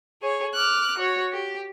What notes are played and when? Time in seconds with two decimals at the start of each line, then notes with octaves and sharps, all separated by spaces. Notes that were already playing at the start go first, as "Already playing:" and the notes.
0.21 G#4 C#5
0.54 D6 F6 F#6
0.97 F#4 C#5
1.32 G4